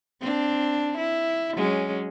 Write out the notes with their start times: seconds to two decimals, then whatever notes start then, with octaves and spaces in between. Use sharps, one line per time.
0.21 C4 D4
0.98 E4
1.55 F#3 G#3 C#4